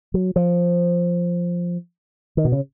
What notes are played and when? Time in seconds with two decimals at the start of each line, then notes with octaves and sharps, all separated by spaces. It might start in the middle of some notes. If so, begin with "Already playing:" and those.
0.14 F#3
0.36 F3
2.37 D#3
2.45 B2
2.52 C#3